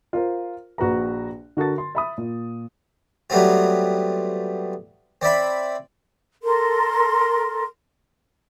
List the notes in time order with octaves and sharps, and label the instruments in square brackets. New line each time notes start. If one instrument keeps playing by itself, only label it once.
[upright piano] F4 A#4 C5
A#1 F#4 B4 A#5
D3 F#4 A#4 A5 A6
C6
E5 B5 D#6
A#2
[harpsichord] F#3 G3 A3 B3 C4 F4
C4 D5 E5 B5
[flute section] A4 A#4 C6